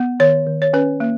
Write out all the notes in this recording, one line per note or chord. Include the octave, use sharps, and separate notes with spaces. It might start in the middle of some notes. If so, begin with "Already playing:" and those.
Already playing: B3
D#3 C#5
D#3
C#5
C#4 B4
A#3